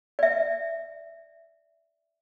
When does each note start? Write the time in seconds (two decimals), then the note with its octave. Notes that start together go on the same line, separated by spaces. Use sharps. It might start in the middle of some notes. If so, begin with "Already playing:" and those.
0.19 D5 E5